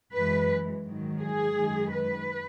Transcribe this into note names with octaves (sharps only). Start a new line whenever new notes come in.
F#2 E3 G#3 B4
G#2 D#3 F#3
G#4
F#2 D#3 G#3
B4